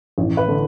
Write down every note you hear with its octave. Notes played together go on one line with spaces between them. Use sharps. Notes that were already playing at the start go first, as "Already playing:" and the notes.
A1
B4
D3